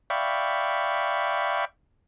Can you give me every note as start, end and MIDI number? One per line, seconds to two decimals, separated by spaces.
0.10 1.65 74
0.10 1.65 76
0.10 1.65 77
0.10 1.65 79
0.10 1.65 83
0.10 1.65 85